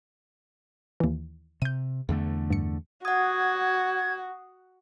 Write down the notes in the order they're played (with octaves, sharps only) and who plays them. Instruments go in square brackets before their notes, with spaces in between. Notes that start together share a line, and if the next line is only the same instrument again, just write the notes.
[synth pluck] D#2 E3
[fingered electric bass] C3 [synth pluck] G6 D#7
[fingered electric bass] E2 D3 A3
[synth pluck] G2 C#7
[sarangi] F#4 [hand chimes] F#5 D#6 [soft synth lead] G#6